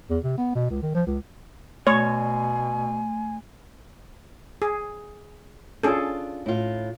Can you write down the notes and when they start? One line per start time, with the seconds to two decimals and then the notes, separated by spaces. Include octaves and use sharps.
0.10 E2
0.24 C3
0.38 B3
0.55 B2
0.70 C#2
0.83 D#3
0.95 F3
1.06 C#2
1.87 B2 A3 C#5 G#5
4.62 G#4
5.83 C#4 D4 F4 G#4 A4
6.46 A2 F4